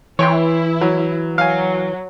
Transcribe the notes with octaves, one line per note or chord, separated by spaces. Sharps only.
E3 E4 C#5 G5 C6
F#3
F#3 F5 G#5